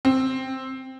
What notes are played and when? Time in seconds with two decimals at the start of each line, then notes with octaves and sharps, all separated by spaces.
0.05 C4